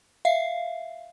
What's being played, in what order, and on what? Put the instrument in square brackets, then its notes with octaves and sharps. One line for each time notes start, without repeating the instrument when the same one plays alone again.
[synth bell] E5 F5 C7